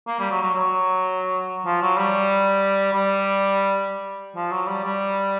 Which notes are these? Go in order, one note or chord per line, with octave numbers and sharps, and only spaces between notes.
A#3
G3
F#3
F#3
F#3
F3
F#3
G3
G3
F3
F#3
G3
G3